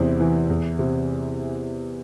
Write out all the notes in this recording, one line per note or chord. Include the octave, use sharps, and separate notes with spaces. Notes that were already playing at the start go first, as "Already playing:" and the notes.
Already playing: E2 C3 C4 E4
E3
E2
C3